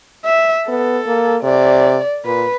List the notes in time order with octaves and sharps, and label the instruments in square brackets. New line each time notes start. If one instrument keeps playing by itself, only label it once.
[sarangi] E5
[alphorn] B3 [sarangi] A4
[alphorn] A#3
[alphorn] C3 [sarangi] D5
[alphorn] A#2 [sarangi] B4